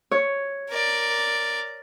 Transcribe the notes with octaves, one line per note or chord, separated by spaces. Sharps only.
C#5
A#4 D5